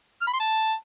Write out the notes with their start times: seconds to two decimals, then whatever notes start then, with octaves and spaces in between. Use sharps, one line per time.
0.21 F6
0.27 B5
0.33 C6
0.39 A5